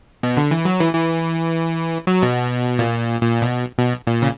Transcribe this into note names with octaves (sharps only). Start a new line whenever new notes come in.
B2
D3
E3
F#3
E3
E3
F#3
B2
A#2
A#2
B2
B2
A#2
C#3